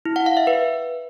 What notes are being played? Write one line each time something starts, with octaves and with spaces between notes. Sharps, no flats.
E4
F#5
F5
E5
B4